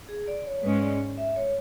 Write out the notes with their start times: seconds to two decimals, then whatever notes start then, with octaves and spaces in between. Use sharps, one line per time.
0.09 G#4
0.28 D5
0.46 C#5
0.63 G#2 G#3 C#4 B4
0.82 D5
1.17 E5
1.36 C#5